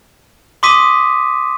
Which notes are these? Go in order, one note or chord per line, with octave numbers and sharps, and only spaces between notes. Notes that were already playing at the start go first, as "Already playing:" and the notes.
C6 D6 D#6 B6 D#7